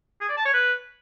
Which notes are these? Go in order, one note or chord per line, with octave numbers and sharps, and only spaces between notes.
G#4
D5
A5
C#5
B4